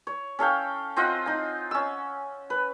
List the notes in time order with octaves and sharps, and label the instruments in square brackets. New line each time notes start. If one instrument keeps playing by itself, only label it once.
[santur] C#5
C#4 A4 F5 G5
C4 F4 D#5 F#5
D#4 G#5
C#4 E6
B4